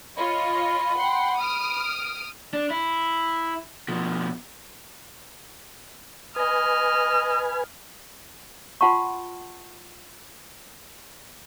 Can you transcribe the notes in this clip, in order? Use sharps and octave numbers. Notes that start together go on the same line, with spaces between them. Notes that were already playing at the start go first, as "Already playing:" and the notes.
F4 C#5 D#5 B5
F#5 G5 C6
D#6 F6 D7
D4
E4
B2 F3
B4 D#5 G#5 F6
F4 F#5 A5 C6 C#6